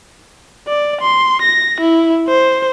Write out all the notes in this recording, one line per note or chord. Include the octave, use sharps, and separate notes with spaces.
D5
C6
A#6
E4
C5